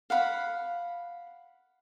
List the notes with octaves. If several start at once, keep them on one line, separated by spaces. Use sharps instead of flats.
F5 F#5 B5